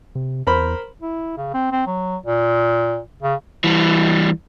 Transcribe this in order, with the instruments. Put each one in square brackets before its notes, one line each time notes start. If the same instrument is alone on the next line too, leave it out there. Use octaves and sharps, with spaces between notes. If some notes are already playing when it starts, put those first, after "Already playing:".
[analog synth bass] C3
[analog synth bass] E2 [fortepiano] A#4 C5 B5
[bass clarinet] E4
C#3
C4
C4
F#3
A#2
C#3
[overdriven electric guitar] E3 G3